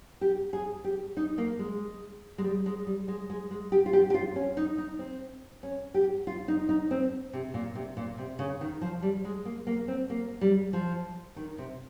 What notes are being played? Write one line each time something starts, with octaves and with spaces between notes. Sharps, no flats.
G4
G#4
G4
D#4
A#3
G#3
G#3
G3
G#3
G3
G#3
G#3
G#3
G4
F4
G4
G4
F4
C#4
D#4
D#4
C4
C#4
G4
F4
D#4
D#4
C4
C3
A#2
C3
A#2
C3
C#3
D#3
F3
G3
G#3
A#3
A#3
C4
A#3
G3
F3
D#3
C3